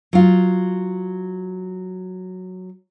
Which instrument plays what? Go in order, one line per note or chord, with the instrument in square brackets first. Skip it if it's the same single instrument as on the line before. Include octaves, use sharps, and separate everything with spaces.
[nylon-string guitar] F#3 F4